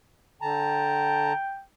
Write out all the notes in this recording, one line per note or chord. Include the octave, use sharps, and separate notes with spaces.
D3 G5 A5 A#5